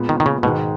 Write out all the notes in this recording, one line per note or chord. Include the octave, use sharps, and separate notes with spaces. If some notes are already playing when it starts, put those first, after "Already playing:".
Already playing: A#2 G#3 B3
D#3
D#3
C#3
G#2 B2 D#3 G#3